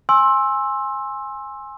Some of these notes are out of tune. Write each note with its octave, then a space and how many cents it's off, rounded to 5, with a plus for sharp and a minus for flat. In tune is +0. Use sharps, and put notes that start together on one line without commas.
G#5 -5 C6 +25 E6 +0